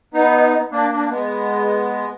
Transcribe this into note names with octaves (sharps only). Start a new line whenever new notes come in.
B3 D#4
A#3 D4
A#3 D4
G#3 B3